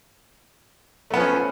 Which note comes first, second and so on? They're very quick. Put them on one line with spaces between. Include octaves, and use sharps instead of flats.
A3 B3 F3 C#4